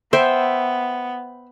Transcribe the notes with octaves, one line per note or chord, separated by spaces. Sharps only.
B3 C5 E5 G5